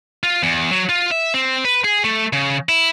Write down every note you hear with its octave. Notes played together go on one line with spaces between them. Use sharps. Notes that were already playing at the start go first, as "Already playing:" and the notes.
F4
E2
F#3
F4
E5
C4
B4
G#4
A3
C#3
E4